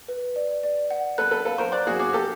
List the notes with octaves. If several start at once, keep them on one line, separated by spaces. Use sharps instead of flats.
B4
D5
D5
F#5
A4 B4 F#6
A4 B4
A4 B4 F5
A#4 C5
C5 D5 F#6
F#4 G#4
F#4 G#4 D6
G4 A4